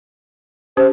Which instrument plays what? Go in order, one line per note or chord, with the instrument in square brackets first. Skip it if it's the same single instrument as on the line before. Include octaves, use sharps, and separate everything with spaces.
[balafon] C#4 G4 [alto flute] C5